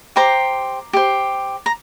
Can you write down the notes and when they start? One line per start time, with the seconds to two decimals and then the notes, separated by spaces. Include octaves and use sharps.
0.16 G4 C5 A#5 D6
0.93 G4 C5
1.66 A#5